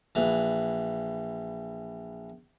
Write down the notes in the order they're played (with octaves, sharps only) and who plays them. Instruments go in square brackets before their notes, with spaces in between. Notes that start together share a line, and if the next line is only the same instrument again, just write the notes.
[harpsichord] A#1 E3